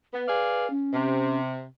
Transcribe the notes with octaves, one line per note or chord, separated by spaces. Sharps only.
B3 B4
G#4 D5 F5
C#4
C3